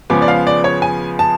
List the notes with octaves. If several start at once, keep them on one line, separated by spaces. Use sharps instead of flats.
C#3 F3 G#3 B3 D6
D5
F5
D5
C#5
G#5
A5